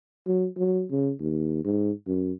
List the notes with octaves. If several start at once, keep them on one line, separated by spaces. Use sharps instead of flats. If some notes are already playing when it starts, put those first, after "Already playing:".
F#3
F#3
C#3
D#2
G#2
F#2